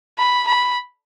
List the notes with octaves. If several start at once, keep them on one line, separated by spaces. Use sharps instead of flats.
B5
B5